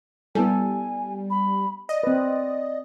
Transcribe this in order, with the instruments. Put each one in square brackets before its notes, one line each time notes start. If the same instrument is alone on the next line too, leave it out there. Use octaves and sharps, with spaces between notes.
[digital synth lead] G3 [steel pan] B3 E4 A4 [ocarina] G#5
[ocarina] B5
[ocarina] D5 [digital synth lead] D#5
[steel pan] C4 B4